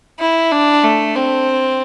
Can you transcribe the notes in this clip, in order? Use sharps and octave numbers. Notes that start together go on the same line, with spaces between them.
E4
D4
A3
C4